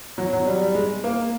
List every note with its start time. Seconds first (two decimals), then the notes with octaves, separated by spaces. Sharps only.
0.18 F#3
0.33 F#3
0.46 G3
0.61 G3
0.75 G#3
1.04 A#3